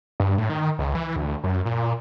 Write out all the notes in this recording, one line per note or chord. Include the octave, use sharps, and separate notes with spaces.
G2
A2
D#3
C#2
E3
D2
F#2
A#2